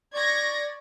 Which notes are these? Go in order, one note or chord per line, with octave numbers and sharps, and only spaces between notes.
D5 C#6 G#6 A#6